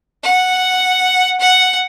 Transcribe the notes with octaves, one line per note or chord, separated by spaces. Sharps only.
F#5
F#5